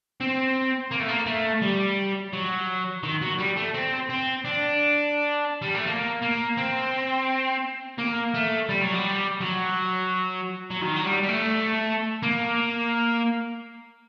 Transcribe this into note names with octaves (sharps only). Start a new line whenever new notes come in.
C4
A#3
A3
A#3
A3
G3
F#3
D#3
F#3
G3
A3
C4
C4
D4
G3
A3
A#3
A#3
C4
A#3
A3
G3
F#3
G3
F#3
F#3
D#3
F#3
G3
G3
A3
A#3